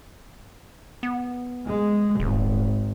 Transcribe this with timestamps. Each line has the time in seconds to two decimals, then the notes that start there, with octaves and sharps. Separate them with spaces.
1.03 B3
1.66 G#3
2.20 D#1 G#1